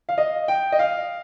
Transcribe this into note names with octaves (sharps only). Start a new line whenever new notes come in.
F5
D#5
G5
D#5
F5